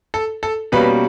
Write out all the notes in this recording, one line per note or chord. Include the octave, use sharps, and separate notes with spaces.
A4
A4
B2 G3 A#3 C#4 B4